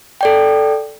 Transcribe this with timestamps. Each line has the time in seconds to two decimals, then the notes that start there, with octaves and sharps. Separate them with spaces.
0.21 A4 D5 G5